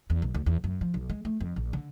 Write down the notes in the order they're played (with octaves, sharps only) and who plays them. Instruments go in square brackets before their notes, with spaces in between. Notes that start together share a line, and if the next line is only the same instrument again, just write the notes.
[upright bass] E2
B1
D2
E2
F#2
F3
B1
G#3
A3
F2
A#1
D3